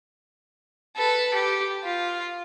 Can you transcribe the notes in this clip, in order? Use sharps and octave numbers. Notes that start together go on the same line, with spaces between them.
A4 B4
G4
F4